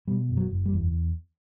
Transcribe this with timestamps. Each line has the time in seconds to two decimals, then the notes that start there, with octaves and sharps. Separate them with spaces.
0.08 B2 G3
0.29 F#1
0.37 F#3
0.51 F#1
0.66 G3
0.73 E2